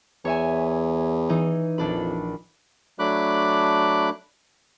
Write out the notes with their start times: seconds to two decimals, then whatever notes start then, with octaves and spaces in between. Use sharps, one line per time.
0.25 E2 C#5 E5 G#5
1.29 E3 D#4
1.78 A#1 F2 D4 B5
2.99 F#3 A3 D4 B5 D6 F#6